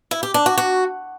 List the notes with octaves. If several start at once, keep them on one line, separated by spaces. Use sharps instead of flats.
E4
G4
D4
F#4
F#4